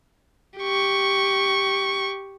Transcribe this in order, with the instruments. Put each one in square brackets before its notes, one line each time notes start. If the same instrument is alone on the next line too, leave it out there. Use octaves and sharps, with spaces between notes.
[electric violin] G4 C#6